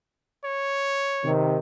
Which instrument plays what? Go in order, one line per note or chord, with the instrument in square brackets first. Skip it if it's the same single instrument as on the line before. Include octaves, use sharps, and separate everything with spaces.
[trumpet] C#5
[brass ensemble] C3 D#3